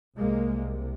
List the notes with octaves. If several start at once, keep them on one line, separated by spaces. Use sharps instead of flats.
C2 C3 G#3 A#3